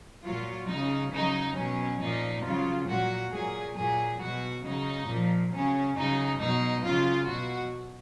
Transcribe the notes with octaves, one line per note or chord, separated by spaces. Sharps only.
A#2 F#3 F4
C#3 F#3 D#4
C#3 F#3 D#4
B2 F#3 C#4
A#2 F3 D#4
C#3 F#3 F4
A#2 F#3 F#4
A#2 F#3 G#4
A#2 F#3 G#4
B2 F#3 F#4
C#3 F#3 D#4
A#2 F3
C#3 F#3 C#4
C#3 F#3 D#4
B2 F#3 D#4
C#3 F#3 F4
B2 F#3 F#4